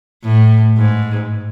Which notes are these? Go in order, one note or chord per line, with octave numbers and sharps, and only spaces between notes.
A2
G#2